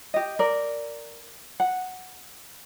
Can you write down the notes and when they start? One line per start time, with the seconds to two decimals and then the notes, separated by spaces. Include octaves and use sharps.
0.14 G4 D#5
0.39 A#4 D5
1.60 F#5